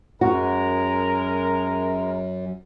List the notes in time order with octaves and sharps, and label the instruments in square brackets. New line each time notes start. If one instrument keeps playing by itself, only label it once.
[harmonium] F#2 [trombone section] G#3 A#4 [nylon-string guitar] F#4